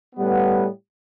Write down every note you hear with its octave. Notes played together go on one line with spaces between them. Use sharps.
A2 G3 B3